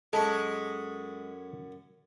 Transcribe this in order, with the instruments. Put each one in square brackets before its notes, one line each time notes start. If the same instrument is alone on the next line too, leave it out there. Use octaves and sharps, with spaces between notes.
[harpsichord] F#2 B5 C#6 [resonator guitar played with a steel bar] G#3 [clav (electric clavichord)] A4